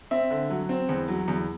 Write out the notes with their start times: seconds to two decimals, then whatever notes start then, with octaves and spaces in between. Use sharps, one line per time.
0.11 C4 E5
0.31 D3
0.50 F#3
0.69 C4
0.89 E2
1.08 F#3
1.28 E2